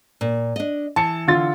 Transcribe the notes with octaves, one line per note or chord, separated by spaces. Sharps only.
A#2
D4 D#5
E3 A5 C#7
D3 F4 A6